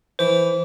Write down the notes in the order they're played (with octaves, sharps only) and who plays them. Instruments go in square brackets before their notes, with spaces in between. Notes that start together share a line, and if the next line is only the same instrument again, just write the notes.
[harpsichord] E3 [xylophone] C5